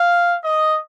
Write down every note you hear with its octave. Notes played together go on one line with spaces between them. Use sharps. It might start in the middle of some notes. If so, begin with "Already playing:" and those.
Already playing: F5
D#5